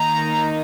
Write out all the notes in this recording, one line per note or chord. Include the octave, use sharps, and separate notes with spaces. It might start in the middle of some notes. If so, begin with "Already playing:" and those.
Already playing: D#3 A#3 D#4 A#5